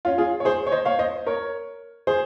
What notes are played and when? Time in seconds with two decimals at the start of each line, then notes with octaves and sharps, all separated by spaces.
0.05 C#4 F4
0.18 F4 G#4
0.40 C#5
0.45 G#4 C5
0.67 C#5
0.72 C5 D#5
0.85 C#5 F5
0.99 C5 D#5
1.26 A#4 C#5
2.07 G#4 C5